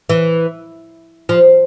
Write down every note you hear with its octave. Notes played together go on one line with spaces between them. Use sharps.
E3
F3